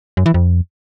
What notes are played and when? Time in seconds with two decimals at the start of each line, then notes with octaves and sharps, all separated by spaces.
0.17 F#2
0.26 E3
0.34 F2